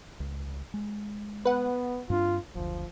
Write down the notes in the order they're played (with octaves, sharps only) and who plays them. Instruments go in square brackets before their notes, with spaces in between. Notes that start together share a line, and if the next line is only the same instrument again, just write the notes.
[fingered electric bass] C#2
G#3
[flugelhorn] B3 [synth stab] B4 F#5
[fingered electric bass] G2 C4 D4 [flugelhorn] F4
[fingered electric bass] F#1 D2 [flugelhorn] F3